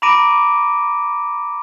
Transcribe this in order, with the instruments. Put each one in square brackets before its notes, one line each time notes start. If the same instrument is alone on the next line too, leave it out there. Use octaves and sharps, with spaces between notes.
[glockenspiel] A#5 B5 D6 A#6 D7 D#7